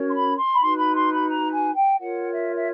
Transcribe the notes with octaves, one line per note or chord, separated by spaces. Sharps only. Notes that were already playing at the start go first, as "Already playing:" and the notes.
Already playing: C#4 F#4 A#4 C#5
C6
B5
C6
B5
D#4 F#4 B4 C6
B5
C6
B5
A#5
G#5
G5
F4 A#4 C#5 F#5
E5
E5